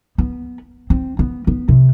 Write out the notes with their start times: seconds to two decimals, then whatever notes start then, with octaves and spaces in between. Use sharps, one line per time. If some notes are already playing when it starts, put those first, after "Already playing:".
0.18 B3
0.90 C4
1.19 B3
1.47 B3
1.68 C3